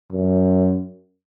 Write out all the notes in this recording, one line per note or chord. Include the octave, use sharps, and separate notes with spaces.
F#2